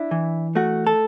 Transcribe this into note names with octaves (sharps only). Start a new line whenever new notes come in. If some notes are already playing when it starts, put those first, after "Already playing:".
Already playing: D4 E4
E3
A3 F#4
A4